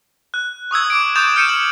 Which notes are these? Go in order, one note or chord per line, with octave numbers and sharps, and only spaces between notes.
F#6
C#6 D#6 E6 G#6
D6 D7
C#6 D#6 G6 A6 E7 F7
F6 G6 C#7 D#7 E7
F#7